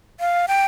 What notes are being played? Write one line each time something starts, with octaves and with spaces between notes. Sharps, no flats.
F5
G5